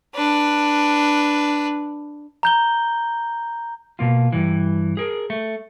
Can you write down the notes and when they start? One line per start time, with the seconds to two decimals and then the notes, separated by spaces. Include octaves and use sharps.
0.15 D4 B4
2.43 A#5 G6 G7
3.99 B2 A#3 F4
4.33 G2 E3
4.97 G#4 A#4
5.30 A3